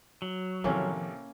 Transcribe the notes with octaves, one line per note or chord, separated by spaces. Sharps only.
F#3
A1 C3 D#3 F3 A#3 C#4 A4